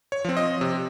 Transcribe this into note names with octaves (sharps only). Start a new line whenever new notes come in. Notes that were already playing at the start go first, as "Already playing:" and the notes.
C#5
F3 C4
D#5
C3